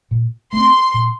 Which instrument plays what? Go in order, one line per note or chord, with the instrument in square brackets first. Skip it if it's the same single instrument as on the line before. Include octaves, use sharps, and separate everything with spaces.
[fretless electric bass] A#2
[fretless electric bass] A3 C4 [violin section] C6
[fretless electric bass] A#2